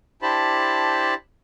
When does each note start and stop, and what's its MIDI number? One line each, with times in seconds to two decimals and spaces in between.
0.22 1.14 62
0.22 1.14 64
0.22 1.14 67
0.22 1.14 72
0.22 1.14 81
0.22 1.14 83